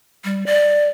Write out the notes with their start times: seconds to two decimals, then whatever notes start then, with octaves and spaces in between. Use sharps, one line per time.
0.24 G3
0.46 D5